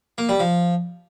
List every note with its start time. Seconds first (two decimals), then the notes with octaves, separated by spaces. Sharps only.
0.18 A#3
0.29 G3
0.40 F3